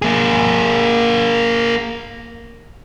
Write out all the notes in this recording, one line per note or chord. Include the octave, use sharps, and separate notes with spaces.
A#3 G#4